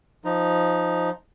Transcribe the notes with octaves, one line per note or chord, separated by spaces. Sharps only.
F3 D#4